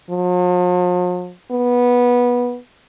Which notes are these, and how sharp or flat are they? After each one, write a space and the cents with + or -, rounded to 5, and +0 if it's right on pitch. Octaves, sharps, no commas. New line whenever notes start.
F3 +45
B3 -15